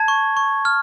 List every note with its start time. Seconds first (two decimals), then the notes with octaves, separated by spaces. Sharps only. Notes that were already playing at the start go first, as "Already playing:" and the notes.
Already playing: A5 G#6
0.08 C#6
0.37 C#6
0.65 F6